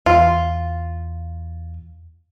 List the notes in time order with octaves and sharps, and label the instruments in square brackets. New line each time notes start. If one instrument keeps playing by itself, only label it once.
[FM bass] E2 [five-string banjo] F4